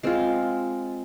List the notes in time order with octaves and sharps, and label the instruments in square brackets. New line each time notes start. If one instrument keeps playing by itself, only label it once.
[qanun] G#3 C4 F4